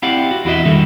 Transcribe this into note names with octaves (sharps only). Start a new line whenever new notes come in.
C4 E4 G4 D5 F5 F#5
F#4
E2 E4 F#4 D#5 E5
D3 D#3 G3 F#4 A4